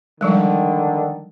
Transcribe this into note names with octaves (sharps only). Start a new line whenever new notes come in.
D3 D#3 F3 G3 G#3